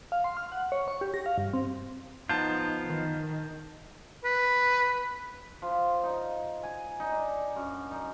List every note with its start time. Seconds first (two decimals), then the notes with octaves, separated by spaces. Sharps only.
0.12 F5
0.24 C6
0.37 F6
0.52 F#5
0.72 C#5
0.88 C#6
1.01 G4
1.14 A#6
1.26 F5
1.38 G2
1.53 C4
2.29 F3 B3 D#4 F4 A5 G6
2.85 D#3
4.24 B4
5.62 F3
6.03 D#4
6.63 G#5
7.00 D#4
7.12 D4
7.56 F#2
7.91 D#4